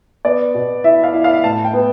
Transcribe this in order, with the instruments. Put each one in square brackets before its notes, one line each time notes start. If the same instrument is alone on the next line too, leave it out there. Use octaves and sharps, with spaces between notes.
[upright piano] B3 D5
B2
E4 E5
F5
E4
F5
A2 A5
G5
B3